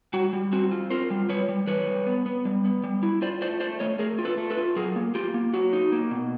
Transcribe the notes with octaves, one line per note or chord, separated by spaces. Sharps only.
G3 F#4
G3
C4 F#4
F4
F4 A#4 C5
G3
G3 B4 C#5
G3
E3 B4 C#5
G3
B3
B3
G3
B3
G3
E4
F4 C5 D5
A3 C5 D5
A3 C5 D5
A3 C#5 D#5
A3 G#4 A#4
F4
A4 B4
A3
A4 B4
F4
F#3 G#4 A#4
A#3
A#3 F4 G4
A#3
F#3 F#4
D#4
A#3
B2